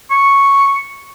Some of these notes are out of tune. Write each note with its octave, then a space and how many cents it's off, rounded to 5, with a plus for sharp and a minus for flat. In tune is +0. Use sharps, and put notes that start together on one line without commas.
C#6 -5